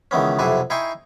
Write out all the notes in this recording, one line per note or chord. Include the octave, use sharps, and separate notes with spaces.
C#2 D#3 E3 B3 C#4
B1 F2 C3 E4 F#4 G#5
D#4 E4 G5 G#5 C6 C#6